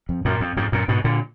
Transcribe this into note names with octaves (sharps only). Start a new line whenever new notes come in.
F2
F#2 A#2
F2
F2 G#2
F#2 A#2
G#2 B2
A#2 D3